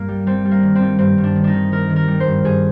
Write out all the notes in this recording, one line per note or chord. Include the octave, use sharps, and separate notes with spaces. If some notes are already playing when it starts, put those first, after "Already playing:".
Already playing: G2 A#3
G3
G3 C4
G3
A#3
D#3
C4
G3
G2 C4
G2
D4
D#3
D4 D#4
D#3
D#3 A#4
D#3
A#4
G3
C5
G2
G2 G#4